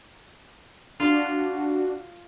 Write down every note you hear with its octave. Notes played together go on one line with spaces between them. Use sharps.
D4 F4 F#4